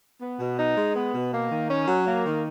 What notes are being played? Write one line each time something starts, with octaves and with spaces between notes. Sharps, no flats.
B3
B2
D#4
G#3
B3
B2
A#3
D#3
C#4
F#3
A#3
D#3